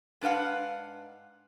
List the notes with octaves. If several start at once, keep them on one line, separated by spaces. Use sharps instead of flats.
G#2 D4 B4 F5 F#5